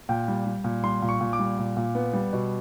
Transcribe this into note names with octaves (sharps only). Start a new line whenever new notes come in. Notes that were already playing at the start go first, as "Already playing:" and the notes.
A#2 G5
G3
G3
A#2
G3 C6
A#2
C#6
A#2
D6
G3
A#2
A#2
B3
G3
B2